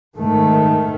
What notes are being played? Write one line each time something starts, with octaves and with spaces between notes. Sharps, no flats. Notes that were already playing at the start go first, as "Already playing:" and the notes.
G#2 D#3 A3